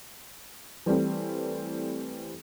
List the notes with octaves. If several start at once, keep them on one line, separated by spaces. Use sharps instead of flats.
E3 G3 A3 C4